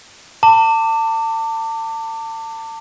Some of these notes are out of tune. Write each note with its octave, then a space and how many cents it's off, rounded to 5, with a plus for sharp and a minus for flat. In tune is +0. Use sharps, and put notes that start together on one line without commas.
A5 +35 D6 +0